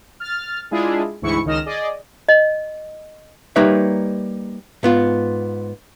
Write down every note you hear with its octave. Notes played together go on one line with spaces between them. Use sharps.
F6 A6
G#3 D4 E4 F4 G#4
D2 G#2 E3 E4 C#6 C#7
C#2 D#3 D#5 F6 A#6 E7
G#4 D5 D#5
D#5
G3 A#3 D#4 B4 C#5 E5
G#2 B3 F4